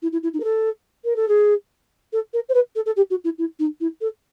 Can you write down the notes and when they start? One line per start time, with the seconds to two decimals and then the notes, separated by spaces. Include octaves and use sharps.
0.02 E4
0.12 E4
0.23 E4
0.34 D#4
0.40 A#4
0.44 A4
1.05 A#4
1.16 A4
1.28 G#4
2.13 A4
2.33 A#4
2.49 C5
2.54 B4
2.76 A4
2.86 A4
2.96 G4
3.10 F#4
3.24 E4
3.38 E4
3.59 D#4
3.81 E4
4.01 A4